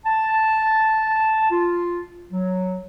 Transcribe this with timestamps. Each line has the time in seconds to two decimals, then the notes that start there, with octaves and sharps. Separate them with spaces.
0.06 A5
1.51 F4
2.31 F#3